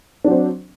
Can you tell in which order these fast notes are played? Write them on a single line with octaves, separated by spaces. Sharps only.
D4 F#3 C4